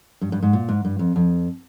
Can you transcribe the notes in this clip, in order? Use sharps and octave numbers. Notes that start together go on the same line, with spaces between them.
G2
G2
G#2
A#2
G#2
G2
F2
F2